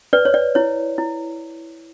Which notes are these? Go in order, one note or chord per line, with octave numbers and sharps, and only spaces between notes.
B4 D5
C#5
D5
E4 C#5
E4